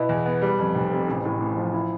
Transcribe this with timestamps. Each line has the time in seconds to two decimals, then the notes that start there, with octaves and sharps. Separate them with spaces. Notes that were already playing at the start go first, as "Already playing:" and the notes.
Already playing: B2 B3 E4
0.09 E2
0.26 B3
0.42 G3
0.59 F2
0.75 F1
0.92 C3
1.08 A1
1.25 A2
1.40 A1
1.57 F3
1.73 E4